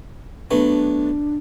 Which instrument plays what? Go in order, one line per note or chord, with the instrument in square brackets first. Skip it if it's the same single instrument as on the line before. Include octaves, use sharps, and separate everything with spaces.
[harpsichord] F#3 A3 B3 [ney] D4